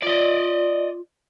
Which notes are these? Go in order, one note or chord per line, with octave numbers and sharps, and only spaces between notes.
F4 D5 D#5